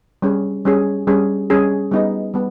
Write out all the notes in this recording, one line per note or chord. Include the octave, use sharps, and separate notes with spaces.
G3 C#4 G#4
G3 C#4 G#4
G3 C#4 G#4
G3 C#4 G#4
G3 B3 D#4 G#4 D#5
G3 B3